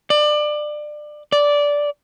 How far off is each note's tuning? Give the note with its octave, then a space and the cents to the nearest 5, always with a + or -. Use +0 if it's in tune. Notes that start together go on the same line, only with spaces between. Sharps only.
D5 +25
D5 -10